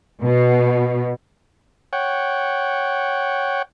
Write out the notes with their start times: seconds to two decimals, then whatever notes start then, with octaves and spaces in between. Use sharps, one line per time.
0.22 B2
1.93 C#5 F#5 G5